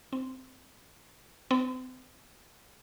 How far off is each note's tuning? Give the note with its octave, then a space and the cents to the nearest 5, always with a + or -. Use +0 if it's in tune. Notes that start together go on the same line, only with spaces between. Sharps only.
C4 -10
C4 -40